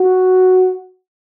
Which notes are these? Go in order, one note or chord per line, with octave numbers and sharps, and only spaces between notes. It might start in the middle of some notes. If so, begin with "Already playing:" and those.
Already playing: F#4